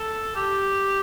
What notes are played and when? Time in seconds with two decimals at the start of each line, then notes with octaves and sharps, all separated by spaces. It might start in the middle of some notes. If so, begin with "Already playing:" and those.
Already playing: A4
0.35 G4